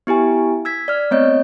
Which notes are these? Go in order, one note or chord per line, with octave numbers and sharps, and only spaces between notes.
B3 E4 G4 G#5
E6 G#6 B6
D5 F6
A3 B3 C4 C#5 D#5 G6